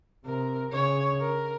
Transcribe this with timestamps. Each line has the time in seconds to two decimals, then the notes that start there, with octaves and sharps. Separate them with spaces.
0.25 C3 A#4
0.72 C#3 C#5
1.21 A#4